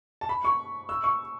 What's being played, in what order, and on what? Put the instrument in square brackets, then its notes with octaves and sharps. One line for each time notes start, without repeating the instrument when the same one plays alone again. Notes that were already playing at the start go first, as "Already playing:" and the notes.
[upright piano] A5
B5
C#6
E6
C#6